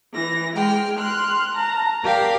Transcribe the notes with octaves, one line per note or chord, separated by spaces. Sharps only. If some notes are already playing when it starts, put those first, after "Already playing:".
E3 A#6
G#3 G5 F6
C6 F6 F#6
A5 A#5
G4 A#4 D5 F5